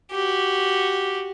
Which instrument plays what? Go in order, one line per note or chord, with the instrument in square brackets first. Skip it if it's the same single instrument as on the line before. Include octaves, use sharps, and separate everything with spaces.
[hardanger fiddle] F#4 G4